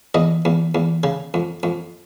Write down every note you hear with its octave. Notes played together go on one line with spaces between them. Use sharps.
E2 D#5
E2
E2
C#3
F2
F2